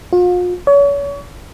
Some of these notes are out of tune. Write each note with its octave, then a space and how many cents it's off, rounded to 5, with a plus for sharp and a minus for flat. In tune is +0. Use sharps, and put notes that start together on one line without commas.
F4 +40
C#5 +35